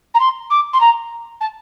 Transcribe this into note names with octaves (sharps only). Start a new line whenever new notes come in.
A#5
C6
D6
C6
A#5
A5